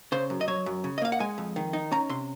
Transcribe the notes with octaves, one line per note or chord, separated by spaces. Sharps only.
C#3 C5
F#2
D#5
F#3 C#5
F#2
C#3
D#5
A#3 F5
F#5
G#3 G#5
F2
D#3
D#4
C#4 A#5
C3 C6